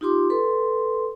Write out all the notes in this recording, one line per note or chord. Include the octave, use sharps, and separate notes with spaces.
D#4 F4 G4 C6 D6
A4 B4 C6